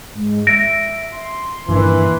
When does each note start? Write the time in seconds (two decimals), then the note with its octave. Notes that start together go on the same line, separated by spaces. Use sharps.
0.15 G#2
0.47 E5 A#6 D7
1.12 C6
1.68 G2 A#2 D#3 E3 D4